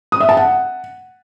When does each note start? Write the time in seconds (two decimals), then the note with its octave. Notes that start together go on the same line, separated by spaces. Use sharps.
0.12 D#6
0.20 E5
0.29 A5
0.37 F#5